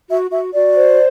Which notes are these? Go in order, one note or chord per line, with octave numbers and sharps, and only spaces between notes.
F#4 E5
F#4 E5
F#4 D5
C5